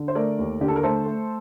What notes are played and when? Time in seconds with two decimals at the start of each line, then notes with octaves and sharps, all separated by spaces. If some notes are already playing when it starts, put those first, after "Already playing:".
Already playing: D3
0.08 C5
0.15 A3 A#4 D5
0.39 D#2
0.61 D3 G4
0.68 A4
0.76 A#4
0.83 A3 A4 C5
1.06 A3